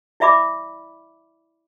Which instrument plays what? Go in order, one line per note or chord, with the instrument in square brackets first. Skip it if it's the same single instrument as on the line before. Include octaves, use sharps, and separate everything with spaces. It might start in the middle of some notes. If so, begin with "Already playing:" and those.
[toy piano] E4 D5 E5 B5 D6